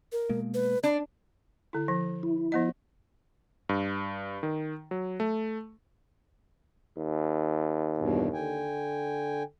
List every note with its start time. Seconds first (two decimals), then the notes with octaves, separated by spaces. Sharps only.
0.12 A#4
0.29 B2 G#3 A#3
0.54 B4
0.83 D4 D5
1.73 D3 E4
1.88 F3
2.23 E4
2.52 F3 B3 D#5
3.69 G2
4.43 D#3
4.91 F#3
5.20 A3
6.98 D#2
7.97 E2 G2 B2
8.33 D3 G5 G#5